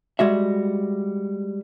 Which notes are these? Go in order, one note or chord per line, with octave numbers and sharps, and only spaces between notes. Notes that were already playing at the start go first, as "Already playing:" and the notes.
G3 G#3 F#4 E5